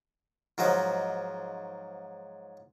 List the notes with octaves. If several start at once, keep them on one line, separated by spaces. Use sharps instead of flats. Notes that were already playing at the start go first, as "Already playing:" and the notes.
G#2 F3 F#3 D#5